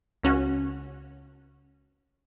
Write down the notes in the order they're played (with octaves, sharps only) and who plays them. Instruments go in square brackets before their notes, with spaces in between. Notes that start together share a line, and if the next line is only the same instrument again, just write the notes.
[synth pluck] C#2 C#4 F#4